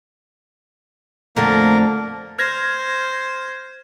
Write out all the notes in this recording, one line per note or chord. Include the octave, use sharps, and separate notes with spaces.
F2 D3 A3 A#3 A#4
C5 F6 G#6 A#6